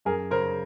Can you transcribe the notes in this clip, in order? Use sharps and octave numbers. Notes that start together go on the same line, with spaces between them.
F#2 G#4 A#4
C#3 A#4 C5